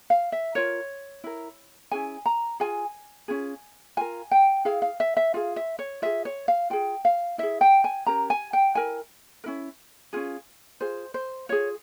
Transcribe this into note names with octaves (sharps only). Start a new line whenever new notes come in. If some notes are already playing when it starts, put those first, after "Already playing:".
F5
E5
F4 A#4 C#5
E4 A#4
C#4 E4 G#4 G#5
A#5
F4 G#4 G#5
C#4 F4 G#4
F4 A#4 G#5
G5
E4 G#4 F5
F5
E5
E5
F4 G#4 F5
E5
C#5
F4 G#4 E5
C#5
F5
F4 G#4 G5
F5
E4 G#4 E5
G5
G#5
C#4 G4 A#4 A#5
G#5
G5
E4 A#4 G#5
C#4 E4 A#4
C#4 F4 G#4
F4 G#4 C5
C5
F4 G#4 C#5